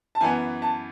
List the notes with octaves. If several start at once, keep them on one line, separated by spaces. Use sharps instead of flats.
A5
F#2 E3 B3 G#5
A5